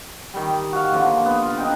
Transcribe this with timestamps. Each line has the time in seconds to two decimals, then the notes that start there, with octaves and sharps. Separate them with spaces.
0.34 D#3 G3
0.73 F#4 F5
0.92 D3 F3 A#3
1.25 B3
1.43 F4
1.58 D4 D#4 G5